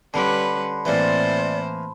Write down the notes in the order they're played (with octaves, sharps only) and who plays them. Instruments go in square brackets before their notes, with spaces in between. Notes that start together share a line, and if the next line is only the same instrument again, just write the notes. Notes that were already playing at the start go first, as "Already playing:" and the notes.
[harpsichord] D3 [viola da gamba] G3 C#4 B4 [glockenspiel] A5 B5 C6
[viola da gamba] A2 C4 C5 [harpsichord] E3 A#3 [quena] D5